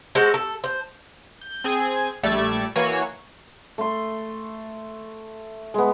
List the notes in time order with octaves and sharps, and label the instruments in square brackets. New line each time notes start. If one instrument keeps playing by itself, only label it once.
[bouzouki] G#3 F#4 A4 C5
A4
C5
[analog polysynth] G6
C4 G#4 G#5
A#1 G3 A3 D5 E6 G#6
E3 A#3 F#4 C#5 G#5
[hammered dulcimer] A3 C6
G#3 B3